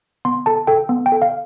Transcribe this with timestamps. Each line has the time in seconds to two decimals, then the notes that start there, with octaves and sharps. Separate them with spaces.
0.25 B3 C6
0.46 A4 A5
0.67 A4 G5
0.89 B3
1.06 G5
1.12 A4
1.22 F5